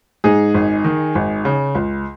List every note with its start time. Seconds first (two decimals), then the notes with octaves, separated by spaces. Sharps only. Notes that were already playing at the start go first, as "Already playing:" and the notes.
0.24 G#2 D#4 G#4
0.54 G#1
0.85 D#3
1.15 G#1
1.45 C#3
1.75 C#2